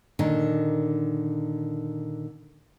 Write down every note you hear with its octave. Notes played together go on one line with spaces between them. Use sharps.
A#2 D3 D#3 D#4